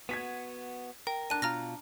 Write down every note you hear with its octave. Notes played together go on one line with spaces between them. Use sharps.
B3 F#4 G#6 B6 D#7
A#4 G5
D4 A5 F#6 D#7
B2 F4 A#5 F6 A#6